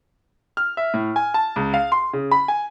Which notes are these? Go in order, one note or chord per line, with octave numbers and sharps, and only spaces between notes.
F6
E5
A2
G#5
A5
C#2
F5
C6
C#3
B5
G#5